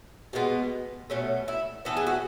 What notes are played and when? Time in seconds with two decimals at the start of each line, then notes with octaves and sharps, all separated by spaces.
0.33 B2 G#3 B3
1.10 B2 A3 C#4
1.48 E4
1.85 A2 E3 B3 A4
1.97 G#4
2.07 F#4